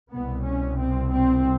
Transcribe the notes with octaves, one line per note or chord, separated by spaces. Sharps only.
C2 B2 B3
C#4
C4
C4